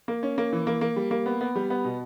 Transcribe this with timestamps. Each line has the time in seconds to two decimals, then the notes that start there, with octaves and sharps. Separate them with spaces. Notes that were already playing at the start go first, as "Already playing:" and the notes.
0.08 A#3
0.23 C#4
0.38 A#3
0.53 E3
0.67 A#3
0.81 A#3
0.96 G3
1.11 A#3
1.26 B3
1.41 B3
1.55 G3
1.70 B3
1.84 B2